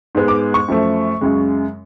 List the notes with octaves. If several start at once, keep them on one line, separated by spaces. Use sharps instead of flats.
G#2 G#3 B3
D6
C#6
F#2 F3 A3
F#2 C#3 G#3